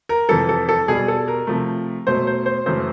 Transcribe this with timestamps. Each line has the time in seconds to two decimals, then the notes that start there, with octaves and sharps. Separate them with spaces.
0.09 A#4
0.29 F2 C3 E3 A4
0.49 A4
0.69 A4
0.88 B2 G3 G#4
1.08 A4
1.28 A#4
1.47 C3 F3 A3
2.07 B2 F#3 A3 C5
2.27 C5
2.46 C5
2.66 F#2 C#3 E3 A3 C5